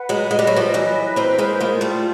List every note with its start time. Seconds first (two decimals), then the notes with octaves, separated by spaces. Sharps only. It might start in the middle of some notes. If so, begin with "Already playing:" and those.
Already playing: B4 F#5
0.09 F#3 G#3
0.31 G#3 D#5
0.39 G3
0.47 F#3
0.56 F3 G3
0.74 E3 F#3 B4
1.16 A#3 C4 C5
1.38 G#3 A#3
1.60 G#3 A#3 F4
1.81 G3 A3